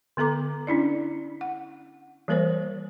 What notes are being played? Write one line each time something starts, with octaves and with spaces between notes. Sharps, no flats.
D3 B3 A4 A#5 D6
C#4 D4 E4 D5
F#5
E3 G3 A#3 A#4 C5 C#5